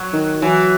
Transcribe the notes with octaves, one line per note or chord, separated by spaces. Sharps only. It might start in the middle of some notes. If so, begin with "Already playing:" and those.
Already playing: F#3
D#3
E3 F#3